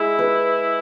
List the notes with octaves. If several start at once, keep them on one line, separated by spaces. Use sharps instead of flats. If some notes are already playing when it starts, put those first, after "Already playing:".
Already playing: G#3 E4
B4